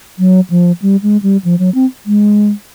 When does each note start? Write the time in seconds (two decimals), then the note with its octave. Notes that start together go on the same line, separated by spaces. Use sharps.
0.19 F#3
0.50 F3
0.82 G3
1.03 G#3
1.23 G3
1.44 F3
1.59 F#3
1.75 C4
2.06 G#3